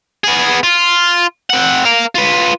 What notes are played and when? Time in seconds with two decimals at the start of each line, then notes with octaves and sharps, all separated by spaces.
0.24 B3 G#4
0.63 F4
1.50 C4 F#5
1.85 A#4 F5
2.15 F4 B4